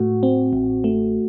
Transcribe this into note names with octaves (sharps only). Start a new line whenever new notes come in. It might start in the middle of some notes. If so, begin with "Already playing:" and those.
Already playing: A2 A3 F#4
C4
A1
A3